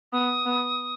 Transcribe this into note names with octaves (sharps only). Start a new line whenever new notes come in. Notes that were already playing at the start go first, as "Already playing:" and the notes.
B3 D#6
B3